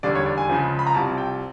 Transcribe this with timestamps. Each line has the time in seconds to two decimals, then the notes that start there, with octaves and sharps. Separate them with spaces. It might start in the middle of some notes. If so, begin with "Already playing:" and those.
0.03 E1 D#2 D3 G3 D5
0.15 C#5
0.26 D5
0.38 G#5
0.49 C#2 C#3 F3
0.79 B5
0.87 A#5
0.95 C2 C3 F3 A5
1.18 G5